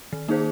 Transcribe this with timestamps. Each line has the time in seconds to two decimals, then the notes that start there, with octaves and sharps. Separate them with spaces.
0.13 D#3
0.28 A#3 D#4 G#4 C5